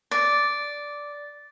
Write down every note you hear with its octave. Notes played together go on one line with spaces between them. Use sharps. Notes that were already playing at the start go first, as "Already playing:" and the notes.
D5